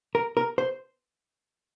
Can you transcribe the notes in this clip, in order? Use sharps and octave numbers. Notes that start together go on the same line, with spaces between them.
A#4
A#4
C5